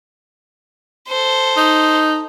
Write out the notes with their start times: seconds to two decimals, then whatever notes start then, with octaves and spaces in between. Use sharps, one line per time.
1.08 A4 C5
1.57 D#4